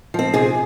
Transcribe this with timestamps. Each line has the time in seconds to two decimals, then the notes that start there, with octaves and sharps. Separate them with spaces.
0.14 F3 C4
0.34 C3 G#4